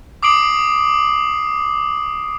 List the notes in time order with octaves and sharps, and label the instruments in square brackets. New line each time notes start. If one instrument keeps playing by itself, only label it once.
[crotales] D6 D#6 C7 D7 F#7